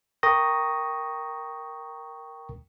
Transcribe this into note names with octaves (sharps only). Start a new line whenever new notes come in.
A#4 G5 A#5 C#6 D#6 A#6